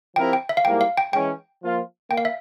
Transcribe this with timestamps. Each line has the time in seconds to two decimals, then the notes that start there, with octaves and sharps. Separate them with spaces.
0.16 F3 C4 E4 G4 A#4 G5
0.33 G5
0.49 E5
0.57 F5
0.64 G#2 G3 A#3 E4 A#4 G5
0.81 F5
0.97 G5
1.13 E3 G#3 C#4 G5
1.62 F3 A#3 F4
2.11 A#3 G5
2.18 F5
2.25 E5